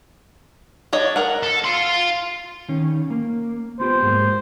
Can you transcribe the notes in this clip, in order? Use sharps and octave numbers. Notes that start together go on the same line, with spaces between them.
D4 C#5 D#5
A#4 F#5
A4
F5 C6
D#3 C#4
A#3
B3 F4 G4 C5
G#2 G#3 A#3